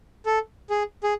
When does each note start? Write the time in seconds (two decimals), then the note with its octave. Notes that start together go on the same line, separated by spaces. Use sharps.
0.26 A4
0.70 G#4
1.03 G#4